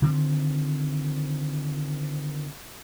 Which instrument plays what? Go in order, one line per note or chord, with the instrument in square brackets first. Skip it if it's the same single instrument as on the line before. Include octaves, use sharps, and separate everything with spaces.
[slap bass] D3 D#3 F3 C4